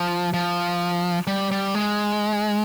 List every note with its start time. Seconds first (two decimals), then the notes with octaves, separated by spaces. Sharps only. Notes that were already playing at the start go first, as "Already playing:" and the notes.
Already playing: F3
0.34 F3
1.27 G3
1.51 G3
1.75 G#3